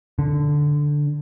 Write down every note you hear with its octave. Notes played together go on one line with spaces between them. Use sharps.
D3